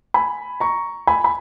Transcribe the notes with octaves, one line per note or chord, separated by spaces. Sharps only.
G#5 B5
A#5 C#6
G#5 B5
B5